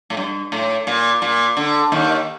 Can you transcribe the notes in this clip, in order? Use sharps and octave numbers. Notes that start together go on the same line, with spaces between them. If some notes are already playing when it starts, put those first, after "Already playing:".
A2
G2
A2
A#2
A#2
D3
D#2 D#3